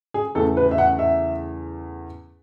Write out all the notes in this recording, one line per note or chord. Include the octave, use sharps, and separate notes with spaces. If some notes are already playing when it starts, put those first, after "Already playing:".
G#4
E2 C#3 E3 A3 A4
B4
E5
F#5
E5